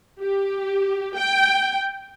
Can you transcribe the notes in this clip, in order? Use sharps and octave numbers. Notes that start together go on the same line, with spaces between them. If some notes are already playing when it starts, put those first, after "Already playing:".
G4
G5